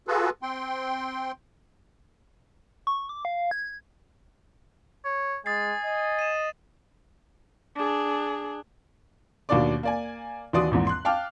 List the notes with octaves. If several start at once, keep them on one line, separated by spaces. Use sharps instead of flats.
F4 F#4 G#4 A4 B4
C4 G5 C6
C#6
D6
F5
G#6
C#5
G#3 G#5 D#6 A6 C7
D#5
D#7 E7
D4 G#4
D#2 B2 A#3 D4 D5 D6
A#3 D5 G#5
D#2 E3 F#4 D5 C6 D#6
A#1 E2 G#2
C6 F#6
F5 G5 A5 D6 F6